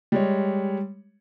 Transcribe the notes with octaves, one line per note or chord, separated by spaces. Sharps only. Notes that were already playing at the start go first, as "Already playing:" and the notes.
G3 G#3 C#5